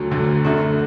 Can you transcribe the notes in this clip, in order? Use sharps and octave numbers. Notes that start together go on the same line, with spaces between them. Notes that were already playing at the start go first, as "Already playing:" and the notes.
Already playing: D2 D3 F#3
D2 D3 F#3
F#2 D3 A3 D4 F#4